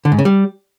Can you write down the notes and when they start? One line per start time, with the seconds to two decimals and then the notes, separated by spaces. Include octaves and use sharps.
0.05 D3
0.12 G#2
0.19 C#3
0.25 G3